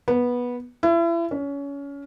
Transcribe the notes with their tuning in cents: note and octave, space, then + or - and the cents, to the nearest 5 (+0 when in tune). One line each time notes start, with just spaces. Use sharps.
B3 -15
E4 +35
C#4 +25